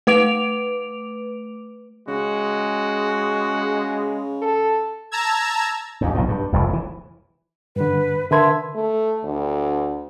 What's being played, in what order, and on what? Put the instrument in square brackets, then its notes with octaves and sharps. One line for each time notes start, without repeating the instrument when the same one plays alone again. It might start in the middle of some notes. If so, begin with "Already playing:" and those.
[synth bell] A3 B4 D6 D7 F7
[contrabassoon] C#3 [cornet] G#3 [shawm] F#4
[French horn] A4
[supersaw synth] A5 A#5 E6 G#6
[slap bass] D#2 G#2
B1 A2
G2
F1 C2 F2
G#2 E3
[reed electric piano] G2 D3 [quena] B4
[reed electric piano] D3 B4 G#6 [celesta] A#4 A5 C6 [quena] E5
[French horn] A3
D2